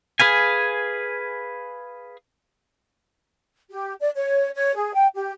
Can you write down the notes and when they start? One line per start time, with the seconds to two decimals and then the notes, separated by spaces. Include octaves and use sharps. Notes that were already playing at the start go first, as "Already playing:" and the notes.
0.20 G#4 B4 F5 G#5
3.70 G4
4.00 D5
4.16 C#5
4.55 C#5
4.75 G#4
4.94 G5
5.15 G4